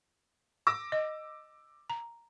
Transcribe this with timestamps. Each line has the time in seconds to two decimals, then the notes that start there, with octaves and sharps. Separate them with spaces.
0.67 D6 E6 A#6
0.92 D#5
1.90 A#5